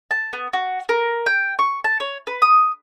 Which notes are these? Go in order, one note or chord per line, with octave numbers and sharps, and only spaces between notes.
A5
B3
F#4
A#4
G5
C#6
A5
C#5
B4
D#6